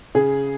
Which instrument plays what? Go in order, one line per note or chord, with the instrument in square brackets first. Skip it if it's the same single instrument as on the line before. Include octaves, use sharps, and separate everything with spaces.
[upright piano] C#3 G#4